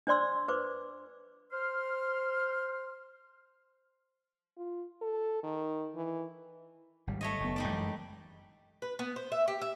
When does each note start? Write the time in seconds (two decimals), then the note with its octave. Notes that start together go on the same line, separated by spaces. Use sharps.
0.07 D4 C5 D5 C6 E6
0.48 B4 C5 D6
1.52 C5 C6 F6
4.57 F4
5.02 A4
5.43 D#3
5.96 E3
7.07 G#1 G3
7.21 A3 C#5 D#5
7.40 F#1 F#2 B3
7.56 G3 D#4 D5
7.69 F#2 E3 G#3
8.82 B4
8.99 B3
9.16 C5
9.32 E5
9.48 G4
9.61 E5